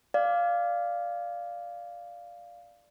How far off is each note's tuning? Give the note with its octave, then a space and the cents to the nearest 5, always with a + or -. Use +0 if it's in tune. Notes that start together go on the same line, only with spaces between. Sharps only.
D5 +0 F5 +0